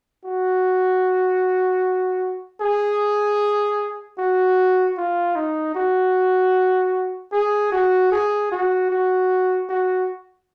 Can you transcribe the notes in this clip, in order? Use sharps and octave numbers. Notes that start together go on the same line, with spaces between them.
F#4
G#4
F#4
F4
D#4
F#4
G#4
F#4
G#4
F#4
F#4
F#4